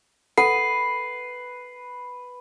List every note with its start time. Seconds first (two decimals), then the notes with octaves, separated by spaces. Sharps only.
0.37 A4 B4 F#5 C7